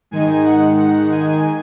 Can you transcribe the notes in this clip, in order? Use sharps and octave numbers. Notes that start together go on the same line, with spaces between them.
G#2 D#3 G#3 D#4 G#5
F#5
F#5
G#5